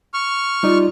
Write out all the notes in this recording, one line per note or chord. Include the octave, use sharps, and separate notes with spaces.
C#6 F6
G3 D#4 F4 D5